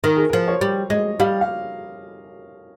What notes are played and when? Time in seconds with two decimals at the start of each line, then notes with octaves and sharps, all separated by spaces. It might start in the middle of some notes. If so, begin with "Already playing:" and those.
0.04 D#3 A#4
0.17 G#4
0.30 A#4
0.33 F3
0.48 C#5
0.61 G3
0.90 G#3 D#5
1.20 G3 F5
1.41 F5